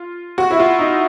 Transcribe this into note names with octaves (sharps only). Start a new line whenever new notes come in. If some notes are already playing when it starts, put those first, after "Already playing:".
Already playing: F4
F#4
E4
F4
D#4